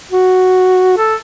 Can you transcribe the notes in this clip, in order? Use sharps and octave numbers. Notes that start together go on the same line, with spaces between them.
F#4
A4